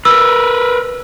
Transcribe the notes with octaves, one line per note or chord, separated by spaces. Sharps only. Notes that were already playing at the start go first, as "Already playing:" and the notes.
A#4 B4 E6